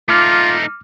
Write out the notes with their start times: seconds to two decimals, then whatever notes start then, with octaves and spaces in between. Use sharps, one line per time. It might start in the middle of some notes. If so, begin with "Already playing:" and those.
0.09 A3 D#4 F4 D6 F6